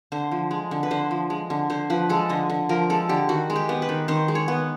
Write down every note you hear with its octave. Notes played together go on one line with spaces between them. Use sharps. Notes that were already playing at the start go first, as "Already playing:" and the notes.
D3 C5
F3
G#3
D3
B4
D3 C5
F3
G#3
D3
D3 C5
F3 B4
G#3 A4
D3 D#5
D3
F3 A#4
G#3 A4
D3 G4
D#3 F#4
G#3
G4
B3
B4
D#3
D#3 C5
G#3
C#5
B3